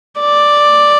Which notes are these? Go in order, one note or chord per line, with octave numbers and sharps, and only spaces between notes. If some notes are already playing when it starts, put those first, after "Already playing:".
D5